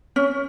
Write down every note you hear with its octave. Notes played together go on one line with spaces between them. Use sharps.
C#4